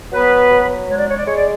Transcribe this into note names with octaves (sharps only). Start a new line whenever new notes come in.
F#3 B3 B4
F#3
G#3 C#5
D5
C#5
D5
G#3 C#5
D5